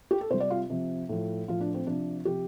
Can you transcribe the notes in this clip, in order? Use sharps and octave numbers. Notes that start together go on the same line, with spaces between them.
G4
A4
C3 G3 C5
D5
F4
C3 F3
A2 F3
A2 F3 F4
D4
C4
C3 F3 D4
C3 F3 G4